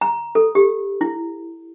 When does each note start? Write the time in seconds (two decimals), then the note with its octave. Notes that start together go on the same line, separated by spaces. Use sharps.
0.01 A#5
0.35 A4
0.55 G4
1.01 E4